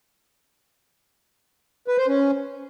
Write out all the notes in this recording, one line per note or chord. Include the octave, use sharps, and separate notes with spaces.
B4
C5
C#4